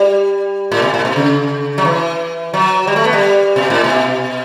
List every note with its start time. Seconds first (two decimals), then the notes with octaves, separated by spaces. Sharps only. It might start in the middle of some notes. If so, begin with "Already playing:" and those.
Already playing: G3
0.72 A2
0.82 B2
0.94 A2
1.05 B2
1.16 C#3
1.78 F#3
1.85 E3
2.54 F#3
2.87 G3
2.96 A3
3.05 B3
3.13 G3
3.56 B2
3.70 A2
3.84 B2